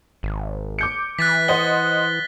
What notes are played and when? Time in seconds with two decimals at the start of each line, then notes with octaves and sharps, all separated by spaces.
0.23 G#1
0.79 D6 G6 C#7
1.19 E3 F#6 A6 B6
1.48 C5 D#5 F#5 G7